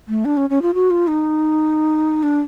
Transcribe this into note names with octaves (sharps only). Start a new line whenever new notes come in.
A3
D4
C#4
C#4
F4
F#4
F4
D#4
D4